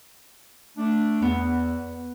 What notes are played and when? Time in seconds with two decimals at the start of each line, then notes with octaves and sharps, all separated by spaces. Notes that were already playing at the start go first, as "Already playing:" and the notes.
0.77 A3 D4
1.22 E2 B3